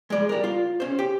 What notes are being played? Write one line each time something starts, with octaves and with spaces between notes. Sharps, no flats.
G#3 D5
G3 A#4
F4
C#4 C5
G4